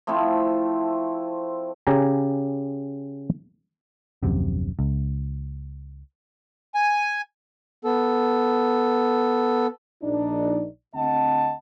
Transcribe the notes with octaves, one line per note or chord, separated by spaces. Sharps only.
F3 A3 C4 E4
C#3 G4 G#5 A#5
D#1 A#1 F#2 C3
C#2
G#5
B3 A4
A#1 D4 D#4 D5
D2 C4 D#5 F#5 A5